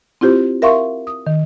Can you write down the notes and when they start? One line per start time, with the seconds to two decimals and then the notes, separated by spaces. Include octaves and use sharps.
0.21 C4 E4 F4 G4 C5
0.62 A#4 E5 F5 C6 C#6
1.07 D#6
1.27 D#3